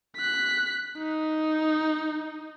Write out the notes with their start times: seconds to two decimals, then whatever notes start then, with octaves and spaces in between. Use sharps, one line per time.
0.17 F#6 B6
0.98 D#4